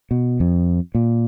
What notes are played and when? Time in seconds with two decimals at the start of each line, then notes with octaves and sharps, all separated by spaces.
0.11 B2
0.40 F2
0.95 A#2